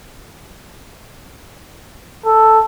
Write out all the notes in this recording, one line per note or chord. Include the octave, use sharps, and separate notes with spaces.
A4